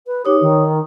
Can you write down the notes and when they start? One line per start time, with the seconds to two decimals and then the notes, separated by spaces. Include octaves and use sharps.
0.06 B4
0.25 D#4 G4 C#5 D#6
0.41 D#3